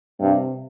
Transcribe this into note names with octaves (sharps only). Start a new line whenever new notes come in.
G2 C3